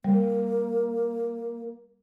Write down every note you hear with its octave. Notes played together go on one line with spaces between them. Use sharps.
G3 A#3